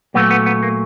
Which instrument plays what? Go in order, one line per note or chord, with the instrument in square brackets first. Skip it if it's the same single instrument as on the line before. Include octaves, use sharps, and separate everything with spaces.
[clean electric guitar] A#2 F#3 A3 B3
B3
B3
A#3